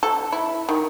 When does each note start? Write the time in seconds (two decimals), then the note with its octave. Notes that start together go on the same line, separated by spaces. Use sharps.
0.03 A4
0.32 E4
0.69 D#3